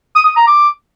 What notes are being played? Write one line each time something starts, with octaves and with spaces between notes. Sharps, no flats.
D#6
D#6
A#5
D6